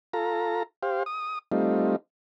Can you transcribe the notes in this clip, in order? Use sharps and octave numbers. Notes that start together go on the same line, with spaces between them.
F4 A4 A#5
G4 C5 F5
D#6
G3 A3 C4 D#4 F4